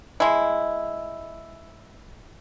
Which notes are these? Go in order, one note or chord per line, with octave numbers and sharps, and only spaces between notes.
G#3 E4